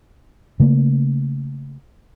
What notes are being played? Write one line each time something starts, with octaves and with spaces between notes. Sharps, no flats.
C#3 A3 A#3